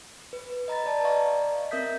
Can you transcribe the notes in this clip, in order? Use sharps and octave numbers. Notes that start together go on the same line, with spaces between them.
B4
D#5 A#5 B5 A6
B4 D5 A5
D5 D#5 F5 A#5 C#6
C4 A#4 E5 D#6 G6 B6